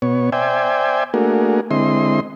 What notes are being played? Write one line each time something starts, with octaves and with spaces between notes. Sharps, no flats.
B2 B3 C#5
C5 D5 E5 G5 G#5
A3 A#3 D4 F#4 G#4 A#4
D3 G#3 C4 E4 D#5 C6